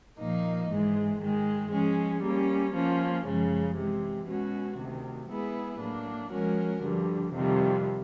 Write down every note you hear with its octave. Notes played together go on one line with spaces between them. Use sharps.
A#2 F3 A#3 D#4
G#2 E3 G#3
G#2 D#3 G#3
F3 G#3 C#4
G3 A#3 C#4
F3 A#3 C#4
F#2 C#3 F3 G#3
C3 E3 G#3
B2 G#3 C#4 F#4
D2 C3 D#3
G#3 B3 E4 G#4 B4
A2 F#3 A#3 D4
F3 G#3 C#4 F#4 A#4
G2 D3 F3
F2 C3 D#3 G3